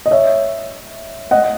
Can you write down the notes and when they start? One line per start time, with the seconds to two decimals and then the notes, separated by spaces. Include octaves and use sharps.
0.06 D#5
0.11 C#5 E5
1.31 D#5 F#5